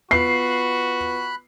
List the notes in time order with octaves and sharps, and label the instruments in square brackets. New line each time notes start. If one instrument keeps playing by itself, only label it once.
[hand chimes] B3 F4 B4 [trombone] F#4 [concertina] B5 F#6 [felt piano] C7